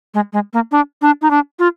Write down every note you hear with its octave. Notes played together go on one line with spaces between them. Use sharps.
G#3
G#3
A#3
D4
D4
D#4
D4
F4